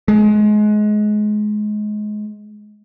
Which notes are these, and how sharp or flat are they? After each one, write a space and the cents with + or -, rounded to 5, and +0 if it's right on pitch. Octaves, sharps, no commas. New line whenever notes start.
G#3 +25